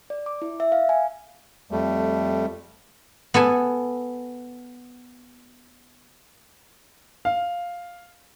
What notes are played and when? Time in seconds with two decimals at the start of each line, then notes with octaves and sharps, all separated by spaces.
0.10 D5
0.26 D6
0.42 E4
0.60 E5
0.72 F5
0.89 G#5
1.71 F2 G3 A3
3.34 B3 A4 G#5
7.25 F5